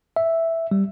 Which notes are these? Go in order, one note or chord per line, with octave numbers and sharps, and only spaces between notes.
E5
G3